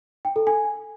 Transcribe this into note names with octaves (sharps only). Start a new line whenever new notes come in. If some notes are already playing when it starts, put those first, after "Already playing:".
G5
A4
G#5